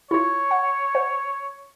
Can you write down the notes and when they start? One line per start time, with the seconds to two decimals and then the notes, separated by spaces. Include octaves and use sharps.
0.11 E4 F4 C#5
0.51 F#5
0.95 C5 F#5